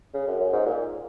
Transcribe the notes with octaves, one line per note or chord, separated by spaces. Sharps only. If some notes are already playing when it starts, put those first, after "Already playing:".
C#3
F#2
F#2
G#2
A#2